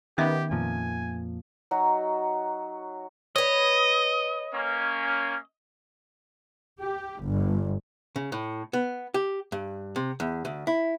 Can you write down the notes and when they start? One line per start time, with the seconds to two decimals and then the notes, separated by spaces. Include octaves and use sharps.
0.18 D#3 B3 C#4 G4 D#5 E5
0.51 F2 A#2 F3 G#5
1.71 F#3 D#4 F#4
3.36 B4 C#5 D#5
4.55 A#3 C#4
6.81 G4
7.23 G1
8.16 C#3
8.32 A2
8.73 B3
9.14 G4
9.52 G2
9.96 C3
10.20 E2
10.45 D2
10.67 E4